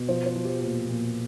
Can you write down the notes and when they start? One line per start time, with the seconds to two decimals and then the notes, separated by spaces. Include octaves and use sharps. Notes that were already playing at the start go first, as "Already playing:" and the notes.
Already playing: B2
0.09 F3 C5
0.26 C5
0.36 F3
0.44 G4
0.61 A#2
0.88 A#2